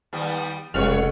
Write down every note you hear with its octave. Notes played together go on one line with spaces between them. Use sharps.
D#2 G3 B3
F1 C#2 F#3 A3 B4 C#5 F#5 F7